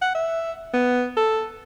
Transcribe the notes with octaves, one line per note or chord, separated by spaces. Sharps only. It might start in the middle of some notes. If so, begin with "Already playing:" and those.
F#5
E5
B3
A4